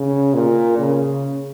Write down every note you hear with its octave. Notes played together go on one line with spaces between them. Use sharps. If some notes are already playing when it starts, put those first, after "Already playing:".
Already playing: C#3
A#2
C#3